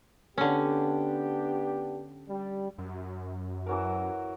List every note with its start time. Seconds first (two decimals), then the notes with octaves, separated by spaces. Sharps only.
0.38 D3 B3 C#4 D4 G4
2.29 G3
2.78 F#2
3.66 E3 F#3 A#4